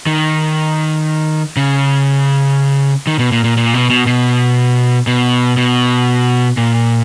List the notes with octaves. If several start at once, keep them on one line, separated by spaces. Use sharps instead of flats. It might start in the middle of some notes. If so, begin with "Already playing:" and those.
D#3
C#3
D#3
B2
A#2
A#2
A#2
B2
B2
B2
B2
B2
A#2